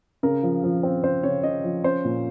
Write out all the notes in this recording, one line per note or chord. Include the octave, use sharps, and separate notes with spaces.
C#3 A#4
F3
F3
C4
C#3 C5
C#3 C#5
C#3 D#5
F3
C#4 C5
A#2